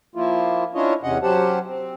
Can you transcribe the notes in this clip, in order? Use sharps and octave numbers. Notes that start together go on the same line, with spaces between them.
F3 A#3 E4 F4
C#4 D4 E4 F4 C#5 D#5
E2 C3 C#4 D#5 F#5
F#3 C#4 G4 C5 F#5 A5
C4